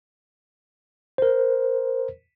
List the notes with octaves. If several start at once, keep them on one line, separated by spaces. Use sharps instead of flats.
A#4 C5